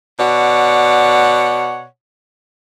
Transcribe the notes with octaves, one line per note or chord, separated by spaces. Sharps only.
B2 C#5 D5 F#5